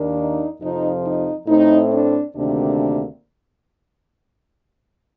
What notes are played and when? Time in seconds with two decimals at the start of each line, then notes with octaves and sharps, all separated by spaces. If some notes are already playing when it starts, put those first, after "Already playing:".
Already playing: D#2 D#3 A#3 D4
0.17 D#4
0.61 F2 C3 F3 D#4
1.04 D#4
1.47 A2 A3 C4 D#4
1.91 D4
2.34 D2 C3 D#3 A#3 D4